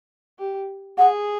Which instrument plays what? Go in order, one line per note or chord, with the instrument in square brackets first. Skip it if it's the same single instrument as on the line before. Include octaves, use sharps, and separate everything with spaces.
[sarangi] G4
[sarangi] G#4 [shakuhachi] F#5